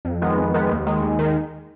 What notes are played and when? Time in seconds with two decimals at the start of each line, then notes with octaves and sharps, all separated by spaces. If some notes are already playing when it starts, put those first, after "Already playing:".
0.05 F2
0.22 D#3 G#3 B3
0.38 F2
0.54 D#3 G#3 B3
0.71 D#2
0.87 D#3 G#3
1.02 D#2
1.19 D#3 G#3